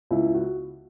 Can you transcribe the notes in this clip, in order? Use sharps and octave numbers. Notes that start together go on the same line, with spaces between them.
C#2 E4
F#4